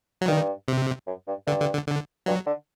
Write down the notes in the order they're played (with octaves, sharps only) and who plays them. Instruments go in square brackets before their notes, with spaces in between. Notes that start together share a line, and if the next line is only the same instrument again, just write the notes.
[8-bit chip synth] F#3
[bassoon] G2 [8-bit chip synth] D#3
[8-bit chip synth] C3
[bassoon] F#2
G2
[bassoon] G2 [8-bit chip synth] D3
[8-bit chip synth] D3
D3
D3
[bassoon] G2 [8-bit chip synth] F#3
[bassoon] D3